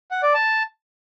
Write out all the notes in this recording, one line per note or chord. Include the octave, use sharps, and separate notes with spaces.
F#5
D5
A5